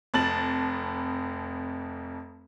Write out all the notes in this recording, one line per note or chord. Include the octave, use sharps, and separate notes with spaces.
F1 F2 A5 A6 F#7